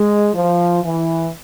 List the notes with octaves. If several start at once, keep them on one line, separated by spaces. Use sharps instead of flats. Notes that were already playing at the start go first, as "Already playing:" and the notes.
Already playing: G#3
F3
E3